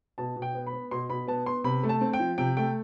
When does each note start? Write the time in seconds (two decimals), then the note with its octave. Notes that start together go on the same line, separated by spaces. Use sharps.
0.18 B2 A5
0.36 B2
0.42 G5
0.55 B3
0.67 B5
0.73 B3
0.91 B2 C6
1.10 B2 B5
1.27 B3 A5
1.46 B3 C6
1.64 C3 B5
1.83 A3
1.89 A5
2.01 C4
2.13 G5
2.19 F3
2.38 C3 G5
2.57 A3 G5